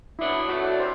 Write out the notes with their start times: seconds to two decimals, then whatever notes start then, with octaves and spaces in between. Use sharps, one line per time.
0.19 A2 F#3 B3 D4 E4
0.49 B2 F#3 A3 F#4
0.64 D5
0.79 C3 C5